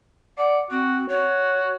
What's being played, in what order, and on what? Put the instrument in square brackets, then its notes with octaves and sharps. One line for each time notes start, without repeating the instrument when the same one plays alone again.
[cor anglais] D5 [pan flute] F#5
[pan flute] C4 [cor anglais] F#4
[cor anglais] F#4 [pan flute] C#5